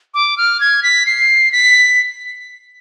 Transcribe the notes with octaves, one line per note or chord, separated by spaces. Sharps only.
D6
F6
G#6
B6
C7
B6